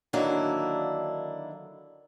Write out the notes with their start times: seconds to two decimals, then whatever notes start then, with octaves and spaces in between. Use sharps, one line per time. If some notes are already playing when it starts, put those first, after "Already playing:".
0.13 D3 D#3 F#3 A#3 D4 E4